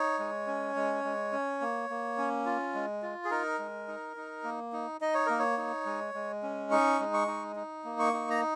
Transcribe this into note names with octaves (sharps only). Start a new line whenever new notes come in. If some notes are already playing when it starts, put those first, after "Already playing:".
Already playing: D#4 C#5
G#3
C#4
G#3
G#3
C#4
A#3
A#3
C#4
F4
G#3
F4
G#4
D#4 A#4
G#3
D#4
D#4
A#3
D#4
D#4 D#5
C#5
A#3 A#4
C#5
D#4
G#3
G#3
C#4
D#4 C#6
G#3
C#6
D#4
D#4
A#3
C#6
D#4
A#5